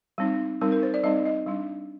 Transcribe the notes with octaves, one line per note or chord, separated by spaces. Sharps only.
G3 C4 D#4
G3 C4 D#4 A#4
A#4
C5
D5
G3 C4 D#4 D#5
D#5
G3 D4